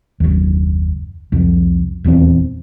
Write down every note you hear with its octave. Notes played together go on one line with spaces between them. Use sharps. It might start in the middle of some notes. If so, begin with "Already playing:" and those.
F#1 D#2
C2 F2
D#1 E2 B3 C4